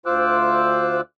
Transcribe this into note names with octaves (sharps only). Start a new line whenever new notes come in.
D2 F4 C5 D6 E6 F#6